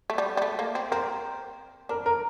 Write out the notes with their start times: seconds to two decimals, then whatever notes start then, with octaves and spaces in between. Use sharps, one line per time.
0.10 A3
0.18 G3
0.37 G3
0.42 A3
0.59 A#3
0.75 C4
0.91 C4 A#4
1.89 D4 A#4
2.06 A#4